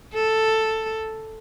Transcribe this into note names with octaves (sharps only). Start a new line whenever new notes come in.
A4